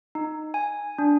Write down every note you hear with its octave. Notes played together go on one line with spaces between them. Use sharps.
D#4
G#5
D4